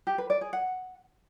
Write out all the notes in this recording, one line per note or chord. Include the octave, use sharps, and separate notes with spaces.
G4
B4
D5
G#4
F#5